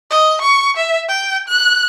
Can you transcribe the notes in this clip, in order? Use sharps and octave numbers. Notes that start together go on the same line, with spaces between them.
D#5
C#6
E5
G5
F#6